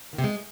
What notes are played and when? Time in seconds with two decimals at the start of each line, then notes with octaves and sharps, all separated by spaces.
0.13 D#3
0.18 C3
0.24 G#3